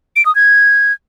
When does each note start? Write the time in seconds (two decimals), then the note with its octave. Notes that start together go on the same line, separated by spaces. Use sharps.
0.16 D7
0.26 D#6
0.35 G#6